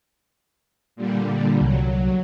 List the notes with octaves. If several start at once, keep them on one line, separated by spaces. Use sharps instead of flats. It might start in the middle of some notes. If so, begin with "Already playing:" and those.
A#2 D3 G3
C2 F#3